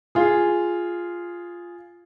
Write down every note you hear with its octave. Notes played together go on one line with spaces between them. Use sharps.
F4 G#4